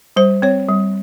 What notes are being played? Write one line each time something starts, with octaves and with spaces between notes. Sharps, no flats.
G3 C5
C4 C#5
G3